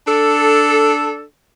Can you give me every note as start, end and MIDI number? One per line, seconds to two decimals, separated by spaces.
0.07 1.24 62
0.07 1.24 69